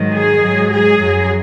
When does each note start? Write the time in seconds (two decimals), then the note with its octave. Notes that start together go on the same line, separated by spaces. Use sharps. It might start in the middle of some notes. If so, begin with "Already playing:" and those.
Already playing: G#2 D#3 F#3
0.12 G#4
0.41 G#2 F#3
0.71 G#4
1.00 F#2 F#3